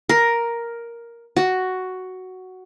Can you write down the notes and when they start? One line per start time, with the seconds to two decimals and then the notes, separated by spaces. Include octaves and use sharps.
0.09 A#4
1.37 F#4